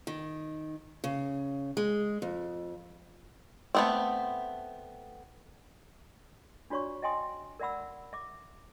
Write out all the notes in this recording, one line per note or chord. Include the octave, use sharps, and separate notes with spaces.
D#3
C#3
G#3
F2
A3 B3 C4
D4 F4 F#4 C#5 D5 C#6
D#5 E5 G5 G#5 C6 D#6
A#4 D5 E5 F#5 B5 E6
E5 D6